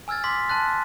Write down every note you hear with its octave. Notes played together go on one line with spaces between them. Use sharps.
G#5 E6 F6 G#6 A6
C6 D6 B6
A5 C6 F#6 A6